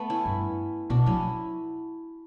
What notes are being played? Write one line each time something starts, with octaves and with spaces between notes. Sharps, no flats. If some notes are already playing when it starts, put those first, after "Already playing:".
Already playing: A3 B3
C#4 E4
G2
B2 D4 F#4
F#3 C#4 E4